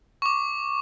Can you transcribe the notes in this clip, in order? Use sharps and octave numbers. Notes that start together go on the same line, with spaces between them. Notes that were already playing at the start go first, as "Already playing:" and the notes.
C#6 D6